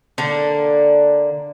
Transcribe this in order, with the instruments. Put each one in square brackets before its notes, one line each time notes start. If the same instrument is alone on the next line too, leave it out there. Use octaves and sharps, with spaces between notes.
[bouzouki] D3 A#3